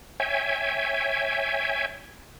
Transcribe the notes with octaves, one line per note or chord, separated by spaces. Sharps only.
C#5 E5 G5 G#5